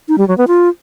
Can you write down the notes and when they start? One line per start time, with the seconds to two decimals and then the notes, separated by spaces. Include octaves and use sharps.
0.08 D#4
0.18 G3
0.28 F#3
0.38 B3
0.48 F4